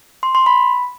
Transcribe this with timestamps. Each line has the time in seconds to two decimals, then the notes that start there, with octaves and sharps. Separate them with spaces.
0.23 C6
0.35 C6
0.46 B5